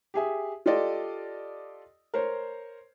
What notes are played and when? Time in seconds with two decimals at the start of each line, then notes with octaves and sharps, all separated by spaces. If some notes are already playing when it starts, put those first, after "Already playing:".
0.14 G4 G#4 E5
0.66 F4 G4 A4 D5 D#5
2.14 A#4 C5 C#5